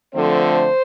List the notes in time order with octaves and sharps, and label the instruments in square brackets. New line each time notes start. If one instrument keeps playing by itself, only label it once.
[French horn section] D3 F3 A3 C4 C5